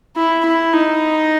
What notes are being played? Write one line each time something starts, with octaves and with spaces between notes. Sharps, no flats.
E4
E4
D#4